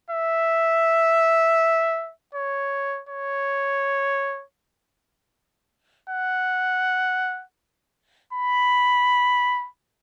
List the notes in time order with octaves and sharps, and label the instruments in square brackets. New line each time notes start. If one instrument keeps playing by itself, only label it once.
[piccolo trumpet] E5
C#5
C#5
F#5
B5